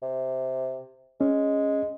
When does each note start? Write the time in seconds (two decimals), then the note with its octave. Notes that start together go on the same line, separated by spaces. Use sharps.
0.02 C3
1.21 G#3 C#4